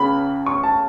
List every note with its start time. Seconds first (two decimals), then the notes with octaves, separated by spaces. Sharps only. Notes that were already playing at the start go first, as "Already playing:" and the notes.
Already playing: C#2 C#3 B5
0.46 C#6
0.63 A5